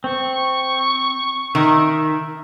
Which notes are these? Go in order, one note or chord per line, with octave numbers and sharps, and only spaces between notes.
C4 C#6
D#3 E5